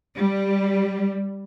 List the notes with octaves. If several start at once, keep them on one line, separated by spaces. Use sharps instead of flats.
G3